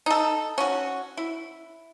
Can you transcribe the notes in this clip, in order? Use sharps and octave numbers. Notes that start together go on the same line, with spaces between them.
D#4 A4
C#4 F#4
E4